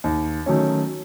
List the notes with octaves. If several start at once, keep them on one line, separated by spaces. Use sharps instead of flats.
D#2
D#3 F#3 A3 C#4